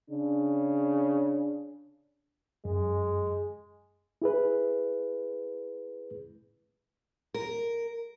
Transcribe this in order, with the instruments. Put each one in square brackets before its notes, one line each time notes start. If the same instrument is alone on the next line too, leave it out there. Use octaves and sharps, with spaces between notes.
[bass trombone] C#3 [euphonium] D4
[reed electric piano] F#2 [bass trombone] G#3
[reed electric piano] E4 G#4 B4
[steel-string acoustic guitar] A#4